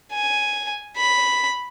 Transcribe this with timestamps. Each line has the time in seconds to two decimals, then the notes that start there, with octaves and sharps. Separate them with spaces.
0.13 G#5
0.97 B5